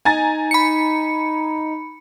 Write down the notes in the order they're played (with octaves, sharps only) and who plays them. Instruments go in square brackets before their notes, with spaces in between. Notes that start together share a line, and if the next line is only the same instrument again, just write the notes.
[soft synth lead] D#4 [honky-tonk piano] G#5 A#5 A6
[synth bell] B5 C#7